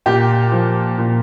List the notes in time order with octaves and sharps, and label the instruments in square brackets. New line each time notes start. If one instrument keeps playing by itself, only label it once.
[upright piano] A#2 G4
F3
A#2